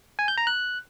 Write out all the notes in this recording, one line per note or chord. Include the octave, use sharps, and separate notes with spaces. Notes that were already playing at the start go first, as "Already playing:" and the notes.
G#5
G6
A#5
F#6